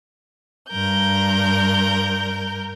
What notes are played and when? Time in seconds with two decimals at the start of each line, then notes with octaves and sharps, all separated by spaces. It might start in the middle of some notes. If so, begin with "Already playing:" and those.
0.69 G2 A#4 G6